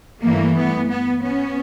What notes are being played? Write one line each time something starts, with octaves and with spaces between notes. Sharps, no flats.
G2 E3 A3 A#3
B3
B3
B3 C#4